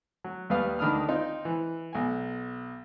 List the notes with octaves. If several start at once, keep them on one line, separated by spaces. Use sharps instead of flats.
F#3
D#2 G3 B4 F5 D#6
D2 D#3 D4 B5 D#6 F6
C4 D#4 F4
E3
B1 G#5